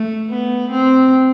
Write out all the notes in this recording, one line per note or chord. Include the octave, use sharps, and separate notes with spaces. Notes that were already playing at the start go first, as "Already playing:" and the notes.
Already playing: A3
B3
C4